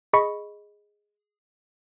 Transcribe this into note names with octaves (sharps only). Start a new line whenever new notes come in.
G#4 D#5 B5 C#6 C#7